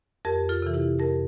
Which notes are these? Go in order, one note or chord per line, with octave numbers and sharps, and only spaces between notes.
F2 G4 A#4
F4 A4
C3 E3
E4 G4
F2 G4 A#4